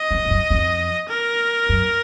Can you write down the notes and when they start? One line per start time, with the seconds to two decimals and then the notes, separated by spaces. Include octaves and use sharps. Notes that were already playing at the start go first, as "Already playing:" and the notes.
Already playing: D#5
0.11 F2
0.25 G#2
0.30 F#2
0.50 F2
1.10 A#4
1.69 F#2